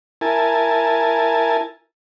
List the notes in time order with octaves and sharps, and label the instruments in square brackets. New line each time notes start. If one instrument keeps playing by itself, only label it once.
[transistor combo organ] E4 A#4 G#5 A5